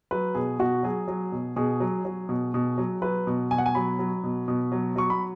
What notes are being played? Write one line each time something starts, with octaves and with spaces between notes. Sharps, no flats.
F#3 B4
B2 G#4
B2 F#4
F#3 G#4
F#3
B2
B2 G#4
F#3
F#3
B2
B2
F#3
F#3 B4
B2
B2 G#5
F#5
G#5
F#3 B5
F#3
B2
B2
F#3
F#3 C#6
B5